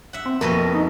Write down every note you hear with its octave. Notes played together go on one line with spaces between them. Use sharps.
E5 F#5
C4
F2 B2 A#3 D#5
D#4